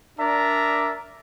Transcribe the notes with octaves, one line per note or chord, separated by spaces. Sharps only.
D4 A#4 D5 E5 A#5